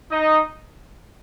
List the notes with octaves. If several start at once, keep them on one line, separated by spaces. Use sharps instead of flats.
D#4 D#5